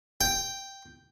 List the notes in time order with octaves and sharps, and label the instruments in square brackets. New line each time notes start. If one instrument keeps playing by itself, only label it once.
[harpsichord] G5